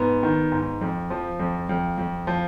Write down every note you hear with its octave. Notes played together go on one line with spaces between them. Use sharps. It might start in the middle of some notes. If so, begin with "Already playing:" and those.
Already playing: G#2 B3
D#3
G#2
F2
F3
F2
F2
F2
F3